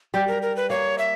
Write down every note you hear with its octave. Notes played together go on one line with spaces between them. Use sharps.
G3 G4
A#4
A#4
B4
A#3 C#5
E5